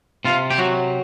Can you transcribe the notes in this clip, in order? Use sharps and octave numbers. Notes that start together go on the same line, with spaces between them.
C3 F4
G4
F#3 F#4